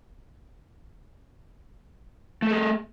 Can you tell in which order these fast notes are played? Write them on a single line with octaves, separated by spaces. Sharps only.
A3 A4 G#4